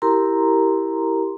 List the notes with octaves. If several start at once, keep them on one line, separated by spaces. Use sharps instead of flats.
E4 G4 A#4 A#5 C6